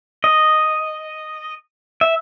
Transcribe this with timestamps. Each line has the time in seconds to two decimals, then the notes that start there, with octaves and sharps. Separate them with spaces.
0.24 D#5
2.01 E5